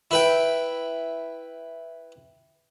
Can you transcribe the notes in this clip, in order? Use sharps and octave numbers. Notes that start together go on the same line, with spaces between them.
E4 B4 G5